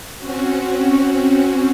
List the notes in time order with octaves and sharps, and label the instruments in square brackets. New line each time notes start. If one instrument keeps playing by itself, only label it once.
[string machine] C4 C#4 F#4